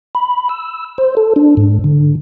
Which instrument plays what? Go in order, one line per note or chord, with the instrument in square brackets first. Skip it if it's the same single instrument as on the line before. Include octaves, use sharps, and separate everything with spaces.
[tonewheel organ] B5
E6
C5
A4
D4
G#2
D3